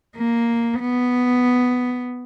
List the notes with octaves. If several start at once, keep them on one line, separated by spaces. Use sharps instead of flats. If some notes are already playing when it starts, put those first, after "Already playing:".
A#3
B3